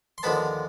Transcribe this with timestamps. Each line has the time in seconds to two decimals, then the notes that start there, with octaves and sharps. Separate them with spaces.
0.18 C6
0.23 D#2 D3 F3 G#3 B3 A5 B5